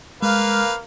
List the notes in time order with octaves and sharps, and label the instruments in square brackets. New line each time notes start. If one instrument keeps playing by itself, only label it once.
[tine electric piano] G#3 [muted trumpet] A#3 [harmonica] B4 F5